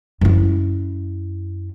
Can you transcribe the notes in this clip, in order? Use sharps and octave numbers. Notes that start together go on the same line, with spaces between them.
F#2 E4